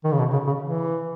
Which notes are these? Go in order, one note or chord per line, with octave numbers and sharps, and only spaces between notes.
D#3
C#3
B2
C#3
C#3
E3